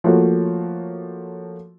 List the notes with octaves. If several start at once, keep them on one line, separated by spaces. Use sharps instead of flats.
F3 A3 A#3 F#4 C#5